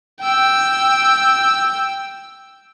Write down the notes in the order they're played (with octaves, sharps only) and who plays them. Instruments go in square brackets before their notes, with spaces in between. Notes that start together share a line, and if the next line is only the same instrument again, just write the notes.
[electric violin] G5 E6